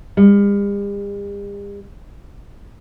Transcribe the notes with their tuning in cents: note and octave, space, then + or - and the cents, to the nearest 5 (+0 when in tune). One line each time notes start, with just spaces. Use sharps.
G3 +45